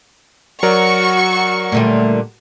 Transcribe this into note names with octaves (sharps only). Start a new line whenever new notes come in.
F#3 F#4 A#4 D5 C#6
A#2 D3 G3 A3